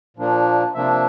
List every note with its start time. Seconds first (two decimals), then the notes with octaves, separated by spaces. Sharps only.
0.17 A#2 F3 A#3 D4
0.75 C3 F3 A#3 D4 E5